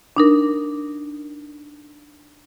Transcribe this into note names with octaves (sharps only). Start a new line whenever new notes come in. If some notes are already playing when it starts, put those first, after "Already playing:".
D4 D#4 A#4